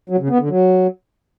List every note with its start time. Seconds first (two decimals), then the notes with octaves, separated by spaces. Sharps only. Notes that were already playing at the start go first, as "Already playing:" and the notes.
0.09 F#3
0.19 C#3
0.29 B3
0.39 D3
0.49 F#3